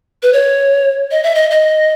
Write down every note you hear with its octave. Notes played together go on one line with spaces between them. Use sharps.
B4
C#5
D#5
E5
D#5
D#5